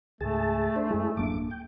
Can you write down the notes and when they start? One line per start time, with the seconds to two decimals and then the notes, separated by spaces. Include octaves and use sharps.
0.21 C#2 G#2 A3 G#4 A5
0.76 D4 C5
0.90 F#2 G#3 E4 G#4
1.17 D1 F#2 A#3 D4 D6
1.51 G5